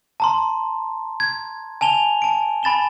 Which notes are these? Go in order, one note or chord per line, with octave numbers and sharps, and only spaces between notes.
A5 A#5 C6
G#6
G#5 A5 F7 G7
A5 D7
G#5 B5 A6 E7 G7